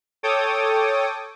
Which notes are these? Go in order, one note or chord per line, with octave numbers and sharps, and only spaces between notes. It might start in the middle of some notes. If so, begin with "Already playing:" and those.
A4 C#5 G5 D6 D#6